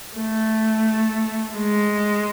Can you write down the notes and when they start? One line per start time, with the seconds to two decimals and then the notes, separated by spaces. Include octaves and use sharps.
0.17 A3
1.57 G#3